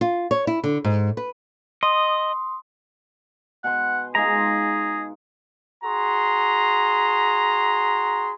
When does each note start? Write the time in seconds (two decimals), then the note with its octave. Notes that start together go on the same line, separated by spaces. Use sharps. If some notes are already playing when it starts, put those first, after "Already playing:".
0.01 F4
0.31 C#5
0.47 E4
0.64 D3
0.84 G#2
1.17 B4
1.83 D#5 C6 D#6
3.64 B2 F#5 G#5 C6
4.15 G#3 D#4 F4 G#4 A#5
5.83 F#4 G#4 A#5 C6